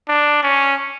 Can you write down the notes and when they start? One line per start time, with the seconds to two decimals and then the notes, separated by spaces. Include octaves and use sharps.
0.08 D4
0.43 C#4